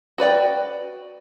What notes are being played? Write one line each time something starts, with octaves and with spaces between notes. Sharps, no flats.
F#4 B4 D5 G5